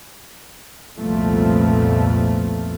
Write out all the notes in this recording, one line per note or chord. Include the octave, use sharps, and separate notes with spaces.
C2 F2 A#2 F3 A3 B3